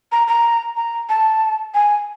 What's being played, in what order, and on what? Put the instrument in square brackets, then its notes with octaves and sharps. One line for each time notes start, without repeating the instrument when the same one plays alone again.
[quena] A#5
A#5
A#5
A5
G#5